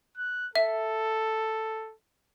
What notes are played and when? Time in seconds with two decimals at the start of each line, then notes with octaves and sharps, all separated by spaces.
0.17 F#6
0.55 A4 E5